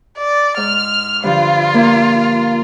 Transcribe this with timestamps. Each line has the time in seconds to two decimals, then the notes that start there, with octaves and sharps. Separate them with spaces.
0.17 D5
0.57 G#2 F6
1.23 G2 D3 F3 F4
1.74 A#3